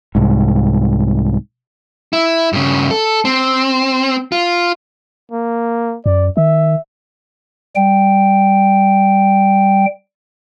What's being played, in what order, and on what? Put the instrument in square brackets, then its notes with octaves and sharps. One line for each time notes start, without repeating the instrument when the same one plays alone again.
[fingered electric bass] C2 G#2
[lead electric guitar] E4
G2 C#3
A4
C4
F4
[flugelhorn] A#3
[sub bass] F#2 [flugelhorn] D5
[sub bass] D#3 [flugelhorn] E5
[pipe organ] G3 G5